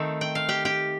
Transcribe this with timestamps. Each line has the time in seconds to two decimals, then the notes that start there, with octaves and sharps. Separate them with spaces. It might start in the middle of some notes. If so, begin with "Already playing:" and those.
Already playing: D#3 A3 C4 D#4 A4
0.21 G5
0.35 F5
0.49 G4 G5
0.65 G4 G5